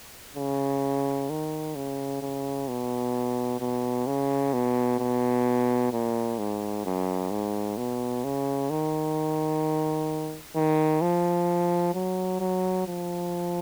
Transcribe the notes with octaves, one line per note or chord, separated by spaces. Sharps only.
C#3
D#3
C#3
C#3
B2
B2
C#3
B2
B2
A#2
G#2
F#2
G#2
B2
C#3
D#3
D#3
F3
F#3
F#3
F3